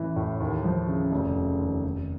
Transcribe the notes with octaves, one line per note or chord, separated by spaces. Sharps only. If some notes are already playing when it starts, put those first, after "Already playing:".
Already playing: A1 E3
A2
D#2
F3
C#3
F1
C#3
D#2
F1